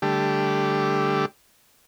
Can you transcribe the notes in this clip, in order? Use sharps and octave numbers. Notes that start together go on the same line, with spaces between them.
D3 G3 A3 G4